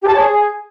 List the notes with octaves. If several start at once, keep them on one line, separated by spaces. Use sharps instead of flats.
G4
A5
C#5
G#4